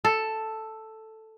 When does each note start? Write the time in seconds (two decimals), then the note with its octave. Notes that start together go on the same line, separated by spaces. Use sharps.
0.05 A4